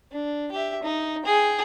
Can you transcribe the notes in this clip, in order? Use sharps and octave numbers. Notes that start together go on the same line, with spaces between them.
D4
G4 E5
D#4
G#4 G5